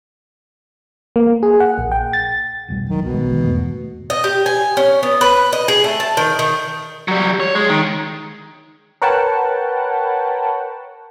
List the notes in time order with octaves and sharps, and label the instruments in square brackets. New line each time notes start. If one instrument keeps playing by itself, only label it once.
[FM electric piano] A#3
G#4
F#5
A#1
G5
A6
[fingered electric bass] F1 B1 G3
[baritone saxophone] D#3 [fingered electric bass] F#3
[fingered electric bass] D#1 C2 [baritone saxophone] B2
[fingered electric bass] A#1 D#3 G#3
D#3
E2 G#2 A3
[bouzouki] D#5
G4
G#5
C#4
B3
B4
D#5
G#4
A3
A5
D#3
D#3
[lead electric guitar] F#3 G3
C#5
G#3
D#3
[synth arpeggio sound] A#4 B4 C#5 F#5 G5 A5